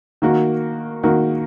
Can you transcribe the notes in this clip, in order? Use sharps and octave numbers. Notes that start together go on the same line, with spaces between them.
D#3 A#3 F#4
D#3 A#3 F#4